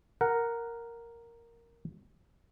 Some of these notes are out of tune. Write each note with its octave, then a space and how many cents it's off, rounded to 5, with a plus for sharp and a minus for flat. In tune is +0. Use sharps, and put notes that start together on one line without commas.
A#4 +0 F#5 +0